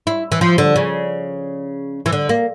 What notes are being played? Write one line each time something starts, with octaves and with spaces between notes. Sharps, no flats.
E4
E3
F3
D3
C#3
E3
D3
A#3